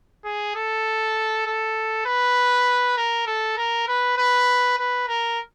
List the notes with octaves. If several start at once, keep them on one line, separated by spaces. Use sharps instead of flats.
G#4
A4
A4
B4
A#4
A4
A#4
B4
B4
B4
A#4